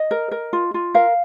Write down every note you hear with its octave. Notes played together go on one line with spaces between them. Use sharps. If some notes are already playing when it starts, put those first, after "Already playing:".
Already playing: D#5
A#4
A#4
F4
F4
A#4 F5